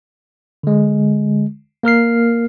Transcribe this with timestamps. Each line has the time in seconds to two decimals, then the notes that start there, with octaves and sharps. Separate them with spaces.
0.63 D3 G#3
1.83 A#3 A#4 F6 C7